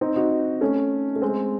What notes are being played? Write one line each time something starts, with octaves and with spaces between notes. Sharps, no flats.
C4 D#4
D#4 F#4
A3 C#4
A3
G#3 C4